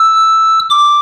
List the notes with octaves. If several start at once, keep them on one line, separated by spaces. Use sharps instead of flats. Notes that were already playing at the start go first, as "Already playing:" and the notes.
Already playing: E6
D6